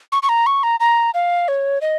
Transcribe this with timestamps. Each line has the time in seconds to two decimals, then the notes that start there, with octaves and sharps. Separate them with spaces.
0.12 C#6
0.23 C#6
0.29 A#5
0.46 C#6
0.63 A#5
0.80 A#5
1.14 F5
1.48 C#5
1.81 D#5